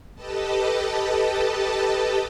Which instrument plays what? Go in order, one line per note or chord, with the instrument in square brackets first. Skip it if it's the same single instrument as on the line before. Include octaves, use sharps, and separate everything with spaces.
[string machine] G4 A4 B4 D#5 A5